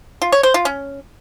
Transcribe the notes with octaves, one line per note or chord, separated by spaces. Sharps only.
F4
C#5
C5
F4
C#4